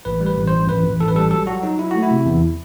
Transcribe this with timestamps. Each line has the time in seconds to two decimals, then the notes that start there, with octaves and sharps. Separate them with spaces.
0.05 A1 B4
0.21 G3
0.26 B4
0.37 A1
0.48 C5
0.53 A1
0.68 A1 B4
0.84 A1
1.00 A1 A4
1.08 B4
1.15 G3 A4
1.31 F#3 A4
1.47 F#3 F#4
1.63 F#3 D#4
1.78 F#3 E4
1.91 A3 F#4
2.03 E4
2.11 C3
2.25 E2